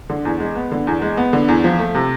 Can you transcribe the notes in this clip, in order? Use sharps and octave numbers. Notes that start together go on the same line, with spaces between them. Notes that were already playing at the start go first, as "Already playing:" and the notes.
D3
E2
G#3
B3
D3
E2
G#3
B3
D3
E2
F3
A3
C3